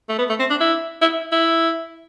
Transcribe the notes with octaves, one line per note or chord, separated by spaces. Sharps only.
A3
B3
A3
C4
D4
E4
E4
E4